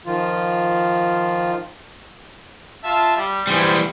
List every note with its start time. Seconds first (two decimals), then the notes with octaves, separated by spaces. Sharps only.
0.06 D#3 F3 F4
2.84 F4 E5 A5
3.16 G3
3.47 E3 G3 C4 G#4